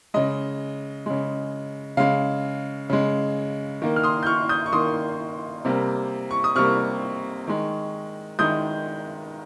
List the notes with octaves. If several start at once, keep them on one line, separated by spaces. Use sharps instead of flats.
C#3 G#3 D#5
C#3 G#3
C#3 G#3 F5
C#3 G#3
D#3 A#3
F6
C6 D#6
G6
C#6 F6
D#6 G6
C#6
D#3 A#3 C6 D#6
C3 G3 A#3
C#6
D#6
C3 G3 A#3 C#6 F6
D#3 G#3
D#3 G#3 D#6 G6